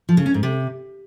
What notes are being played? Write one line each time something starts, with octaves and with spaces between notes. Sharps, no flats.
F3
C#3
C#4
G#2
C3